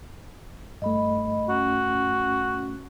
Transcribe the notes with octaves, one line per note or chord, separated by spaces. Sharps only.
G2 A3 D#5 B5
C#4 F#4